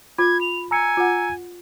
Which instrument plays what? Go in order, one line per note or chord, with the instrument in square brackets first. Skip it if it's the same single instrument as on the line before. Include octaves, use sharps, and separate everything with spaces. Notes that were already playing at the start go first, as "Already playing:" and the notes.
[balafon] F4 [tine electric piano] B5 [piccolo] G#6
[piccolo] F7
[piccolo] G#5 [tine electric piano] A#5 E6 C#7
[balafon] F4 F#5